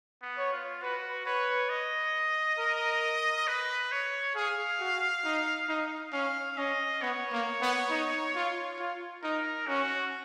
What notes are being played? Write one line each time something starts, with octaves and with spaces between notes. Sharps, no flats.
B3
C#5
F4
F#4 B4
B4 C#5
D#5
A#4
B4
C#5
G#4 F5
F#4
D#4
D#4
C#4 F5
C#4 D#5
B3 C#5
A#3
B3
D#4
F4
F4
D#4 A#4
C#4 F#4